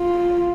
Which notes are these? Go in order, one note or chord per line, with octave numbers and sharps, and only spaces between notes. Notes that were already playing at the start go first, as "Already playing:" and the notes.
Already playing: F4